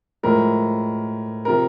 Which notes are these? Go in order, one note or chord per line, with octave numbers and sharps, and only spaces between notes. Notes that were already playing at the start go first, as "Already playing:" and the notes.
A2 F3 G#3 A#4
C3 F3 A#4